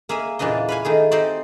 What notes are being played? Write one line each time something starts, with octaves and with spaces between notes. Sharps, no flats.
A#3 G#4 E5 G#5
E2 A#2 C#3 E3 D4 D#5
B4 F5 G#5
D#3 A3 G#4
C4 D#4 G4 C5 D5